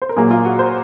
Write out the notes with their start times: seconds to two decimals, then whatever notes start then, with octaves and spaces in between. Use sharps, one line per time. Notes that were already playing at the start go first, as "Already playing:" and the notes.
0.02 C5
0.09 A#4
0.17 A#2 F#3 A#3 G#4
0.31 F4
0.45 F#4
0.59 C5